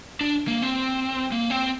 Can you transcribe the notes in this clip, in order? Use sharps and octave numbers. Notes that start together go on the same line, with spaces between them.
D4
A#3
C4
A#3
C4